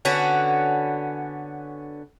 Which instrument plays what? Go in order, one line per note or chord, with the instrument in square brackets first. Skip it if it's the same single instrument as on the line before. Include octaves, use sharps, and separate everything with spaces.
[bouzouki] D3 B3 C#4 F#4